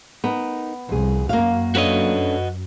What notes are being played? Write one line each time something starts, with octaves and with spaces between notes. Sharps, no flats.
B3 D#4 A#4
C2 F2 G#4
F#2 A#3 F#4 F5
A3 C#4 D4 F#4 B4 D#5